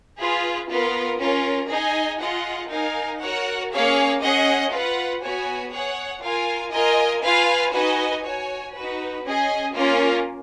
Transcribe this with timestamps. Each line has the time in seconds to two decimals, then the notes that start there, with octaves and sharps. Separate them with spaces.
0.18 F4 G#4 B4
0.70 B3 F4 A#4
1.19 C#4 F4 A#4
1.70 D#4 G#4 D#5 G#5
2.20 F4 G#4 D#5 F#5
2.70 D#4 A#4 F5 G#5
3.20 F#4 A#4 C#5 F#5
3.72 A#3 C#4 G#4 C#5 F5
4.22 C#4 G#4 D#5 F#5
4.72 F4 B4 F#5
5.22 B3 F#4 C#5 G#5
5.72 G#4 C#5 F#5
6.22 F4 A#4 F5 G#5
6.73 F4 A#4 D#5 G#5
7.24 F4 B4 F5 G#5
7.74 D#4 F#4 B4 D#5 G#5
8.23 F#4 C#5 G#5
8.75 D#4 F#4 B4
9.24 C#4 G#4 D#5 G#5
9.75 A#3 C#4 F4 A#4